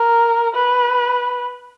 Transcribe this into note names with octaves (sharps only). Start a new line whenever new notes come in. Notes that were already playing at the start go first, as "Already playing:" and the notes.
Already playing: A#4
B4